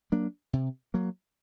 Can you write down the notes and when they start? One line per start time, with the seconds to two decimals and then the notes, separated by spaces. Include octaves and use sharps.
0.12 F#3 A#3 D4
0.53 C3
0.94 F#3 A#3